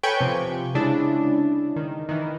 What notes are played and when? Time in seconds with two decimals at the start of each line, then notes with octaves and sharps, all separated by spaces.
0.03 A4 B4 C#5 G5 G#5 C#6
0.21 C3 F3
0.75 C#3 G#3 D4 E4
1.76 D#3
2.09 D#3 E3